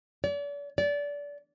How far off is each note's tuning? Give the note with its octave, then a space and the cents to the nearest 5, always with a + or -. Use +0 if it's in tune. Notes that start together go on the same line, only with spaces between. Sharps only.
D5 -40
D5 -25